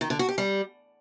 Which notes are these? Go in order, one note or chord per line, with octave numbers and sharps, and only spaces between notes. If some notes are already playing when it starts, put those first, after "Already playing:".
D#3
D3
F#4
G4
G3